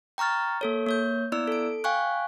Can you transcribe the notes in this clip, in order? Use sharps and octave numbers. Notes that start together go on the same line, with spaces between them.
G5 A#5 C#6 F6 A6
A#3 A4 C#5
A#3 C#5 G6
B3 E4 D5 E6
A4 D7
F5 G5 G#5 C#6 F#6